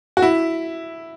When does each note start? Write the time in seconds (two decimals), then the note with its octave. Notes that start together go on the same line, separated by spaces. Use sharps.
0.17 F#4
0.22 E4